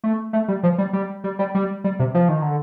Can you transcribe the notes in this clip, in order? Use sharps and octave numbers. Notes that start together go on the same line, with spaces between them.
A3
A3
G3
F3
G3
G3
G3
G3
G3
G3
C3
F3
D#3
D3